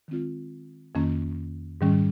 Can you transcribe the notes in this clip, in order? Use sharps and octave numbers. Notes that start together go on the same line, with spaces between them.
D#3 G#3 C4 F4
F2 D#3 A#3 C#4
G#2 D#3 G3 C#4